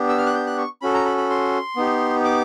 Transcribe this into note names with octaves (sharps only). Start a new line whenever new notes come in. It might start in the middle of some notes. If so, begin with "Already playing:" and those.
Already playing: B3 D4 G4
E6
F6
F#6
G6
F#6
C#6
C#4 F#4 A4 B5
A#5
B5
B5
C6
B3 D#4 G4
D6